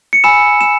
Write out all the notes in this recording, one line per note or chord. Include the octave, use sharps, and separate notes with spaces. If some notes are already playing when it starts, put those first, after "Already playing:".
C#7
G#5 B5 E6 E7
E7